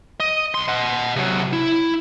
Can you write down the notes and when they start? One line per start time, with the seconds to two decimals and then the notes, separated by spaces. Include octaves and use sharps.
0.20 D#5
0.55 B1 C6
0.68 D#5 F#5
1.16 C3 F#3
1.53 E4